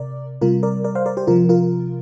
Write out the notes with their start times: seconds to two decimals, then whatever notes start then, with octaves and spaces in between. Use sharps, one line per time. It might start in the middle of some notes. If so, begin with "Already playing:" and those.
Already playing: C3 A#4 D5
0.41 C3 G3 F4 A#4
0.63 A#4 D5
0.84 A#4 D5
0.95 C5 F5
1.06 A#4 D5
1.17 G4 C5
1.27 C3 F3 F4 A#4
1.49 F4 A#4